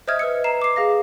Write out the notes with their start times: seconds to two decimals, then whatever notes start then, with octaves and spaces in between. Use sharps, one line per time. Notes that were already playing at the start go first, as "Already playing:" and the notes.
0.08 C5 D#5 E5 D#6 F6 G#6
0.19 B4 E6 C#7
0.44 A#5 C7 E7
0.62 D6 C7
0.76 G#4 F5 A#6